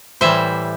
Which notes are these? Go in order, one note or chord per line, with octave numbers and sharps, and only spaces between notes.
A2 E3 G3 C5 E5